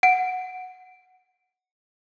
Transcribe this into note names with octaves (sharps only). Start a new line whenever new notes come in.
F#5 D7